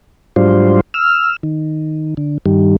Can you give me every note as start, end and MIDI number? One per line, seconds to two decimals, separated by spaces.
0.36 0.81 44
0.36 0.81 54
0.36 0.81 55
0.36 0.81 62
0.36 0.81 65
0.36 0.81 72
0.94 1.36 88
0.94 1.36 89
1.43 2.14 51
2.17 2.38 50
2.46 2.76 43
2.46 2.76 51
2.46 2.76 55